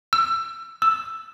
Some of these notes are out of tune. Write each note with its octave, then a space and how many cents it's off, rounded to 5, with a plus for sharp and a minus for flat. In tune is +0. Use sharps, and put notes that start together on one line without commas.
E6 +25
E6 +5